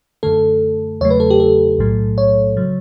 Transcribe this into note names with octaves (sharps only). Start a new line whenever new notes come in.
F#2 D3 A3 A4
E2 C#3 F#3 A3 C#5
B4
A4
G4
A4
B1 A2 F#3 A3
C#5
C#3 F#3